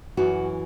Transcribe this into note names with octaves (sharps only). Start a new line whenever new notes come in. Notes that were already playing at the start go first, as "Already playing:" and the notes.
F#2 E3 F#4